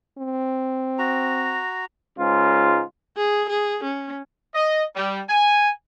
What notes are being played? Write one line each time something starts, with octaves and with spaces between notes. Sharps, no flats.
C4
F#4 A#5
C#2 G#2 F4
G#4
G#4
C#4
D#5
G3
G#5